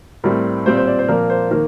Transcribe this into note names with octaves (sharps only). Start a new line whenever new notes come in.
A2 G3 C4 A#4
A#2 G3 C4 C5
C5
D5
C5
A#2 F3 A#3 A#4
C5
D#3 A#3 A#4